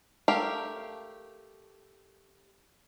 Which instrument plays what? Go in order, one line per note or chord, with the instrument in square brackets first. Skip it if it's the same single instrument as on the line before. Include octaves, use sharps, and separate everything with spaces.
[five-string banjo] A3 G4 A#4 F5